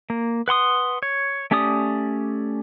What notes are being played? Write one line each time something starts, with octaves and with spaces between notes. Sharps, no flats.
A#3
B4 F#5 C6 D#6
C#5
A3 C#4 G4 D5 D#6